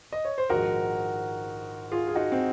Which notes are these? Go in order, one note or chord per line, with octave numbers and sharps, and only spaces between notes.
D#5
C#5
C5
A#1 G#2 D#3 G#3 F#4 A#4
F4 G#4
G#4
D#4 F#4
C4